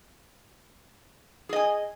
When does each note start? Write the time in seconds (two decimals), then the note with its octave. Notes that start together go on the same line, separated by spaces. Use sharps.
1.49 G#4
1.53 D#5
1.56 G#5